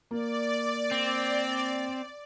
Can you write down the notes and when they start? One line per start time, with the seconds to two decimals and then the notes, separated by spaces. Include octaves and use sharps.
0.11 A#3 D5
0.91 C4